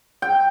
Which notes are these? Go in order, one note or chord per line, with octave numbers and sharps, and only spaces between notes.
G5